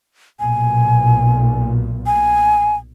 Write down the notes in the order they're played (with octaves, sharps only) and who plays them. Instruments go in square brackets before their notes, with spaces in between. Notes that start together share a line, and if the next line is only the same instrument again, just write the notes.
[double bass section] B1 A#2 [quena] G#5
[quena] G#5